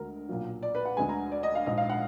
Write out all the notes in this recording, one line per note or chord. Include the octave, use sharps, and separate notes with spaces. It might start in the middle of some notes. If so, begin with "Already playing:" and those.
Already playing: D2 D3 G#3 A#4
B1 A#2 F#3 A#3
D5
B4
F#5
D2 D3 G#3 G#5
A#5
D5
D#5
F5
A#1 G#2 F3 D#5
F5
F#5